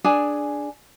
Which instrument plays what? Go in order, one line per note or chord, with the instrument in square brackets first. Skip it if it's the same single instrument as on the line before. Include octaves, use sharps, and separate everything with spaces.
[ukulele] D4 G#4 G#5